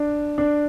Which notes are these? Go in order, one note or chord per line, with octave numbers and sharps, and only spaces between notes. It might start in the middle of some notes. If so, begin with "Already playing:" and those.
Already playing: D4
D4